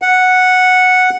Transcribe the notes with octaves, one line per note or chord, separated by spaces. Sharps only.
F#5